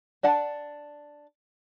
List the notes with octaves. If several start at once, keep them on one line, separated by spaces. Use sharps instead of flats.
D4 D5 F#5 A5